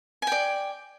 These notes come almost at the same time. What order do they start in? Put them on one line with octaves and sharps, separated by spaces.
G#5 G5 D5